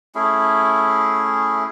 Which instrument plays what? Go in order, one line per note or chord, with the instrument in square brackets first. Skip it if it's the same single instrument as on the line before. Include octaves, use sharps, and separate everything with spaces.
[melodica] A3 C#4 E4 G#4